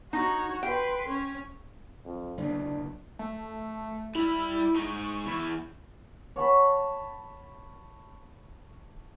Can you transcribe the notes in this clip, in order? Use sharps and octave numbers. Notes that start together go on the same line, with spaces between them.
D#4 F#4 C#5
B4 G5 C6
C#4
F2
F#1 D2 B2 D4
A3
G3 E4 B5
G#3 D#4 C#6
E2 E4
C#5 F#5 A5 B5